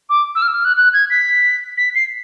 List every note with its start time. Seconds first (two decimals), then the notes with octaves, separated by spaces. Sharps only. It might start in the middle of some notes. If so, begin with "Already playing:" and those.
0.09 D6
0.35 E6
0.42 F6
0.48 E6
0.54 F6
0.65 F#6
0.77 F#6
0.93 G#6
1.10 B6
1.77 B6
1.95 C7